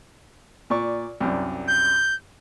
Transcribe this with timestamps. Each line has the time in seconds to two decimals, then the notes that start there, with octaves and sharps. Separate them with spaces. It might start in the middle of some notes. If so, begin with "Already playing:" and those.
0.70 A#2 D5 C#6
1.20 C2 F#2 D4
1.68 G6